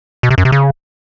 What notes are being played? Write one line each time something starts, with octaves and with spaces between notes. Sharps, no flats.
B2
C3
F#2
C3
C#3